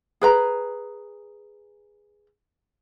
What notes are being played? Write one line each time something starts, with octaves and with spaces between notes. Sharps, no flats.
G#4 B4 A#5